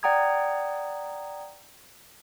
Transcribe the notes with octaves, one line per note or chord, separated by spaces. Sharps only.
D5 F#5 G5 A#5 D#6 G#6